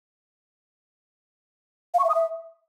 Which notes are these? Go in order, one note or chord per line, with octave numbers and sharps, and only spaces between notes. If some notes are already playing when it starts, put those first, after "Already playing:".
F5
C#6
E5
D#6
E5